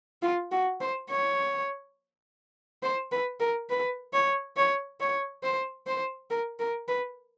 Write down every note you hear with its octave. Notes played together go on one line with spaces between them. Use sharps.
F4
F#4
C5
C#5
C5
B4
A#4
B4
C#5
C#5
C#5
C5
C5
A#4
A#4
B4